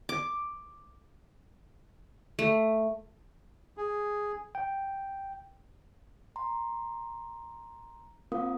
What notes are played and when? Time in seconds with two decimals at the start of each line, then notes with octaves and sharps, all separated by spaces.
0.09 D6
2.39 A3
3.77 G#4
4.55 G5
6.36 A#5 C6
8.32 A#3 C4 F4 A#4 F5 D#6